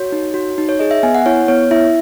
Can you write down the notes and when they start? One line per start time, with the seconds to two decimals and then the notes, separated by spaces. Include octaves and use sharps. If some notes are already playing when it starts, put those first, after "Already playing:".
Already playing: F#4 C#5
0.12 D#4
0.34 F#4
0.58 D#4
0.69 C#5
0.79 G#4 D#5
0.91 E5
1.03 B3 G#5
1.15 F#5
1.26 E4 C#5
1.48 B3 C#5
1.71 E4 E5